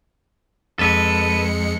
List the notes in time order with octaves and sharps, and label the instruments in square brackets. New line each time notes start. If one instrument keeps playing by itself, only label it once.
[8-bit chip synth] F2 G#3 C#7 [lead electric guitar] A4 B4